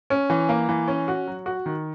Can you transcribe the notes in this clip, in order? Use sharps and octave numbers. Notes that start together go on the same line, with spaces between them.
C#4
E3
A#3
E3
C#4
F#4
F#3
F#4
D#3